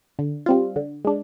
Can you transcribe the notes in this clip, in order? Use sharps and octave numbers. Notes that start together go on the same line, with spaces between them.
D3
G3 C4 F4
D3
G#3 D4